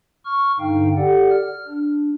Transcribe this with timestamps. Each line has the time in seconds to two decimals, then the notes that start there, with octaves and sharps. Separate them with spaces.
0.25 C#6 F6
0.59 G2 D3 D#4 F5 G5
0.97 G4 A4 D5 F#5
1.30 F6
1.67 D4